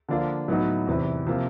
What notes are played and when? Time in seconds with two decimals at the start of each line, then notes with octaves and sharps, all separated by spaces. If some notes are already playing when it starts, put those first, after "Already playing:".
0.08 D3 F3 A#3 D4 F4
0.48 A2 F#3 B3 D#4 F#4
0.87 E2 C3 E3
1.26 C3 F3 A#3